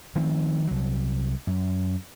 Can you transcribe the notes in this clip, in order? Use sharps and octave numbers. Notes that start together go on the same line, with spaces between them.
D#3 F3 A3 C4
C2 F#3
F#2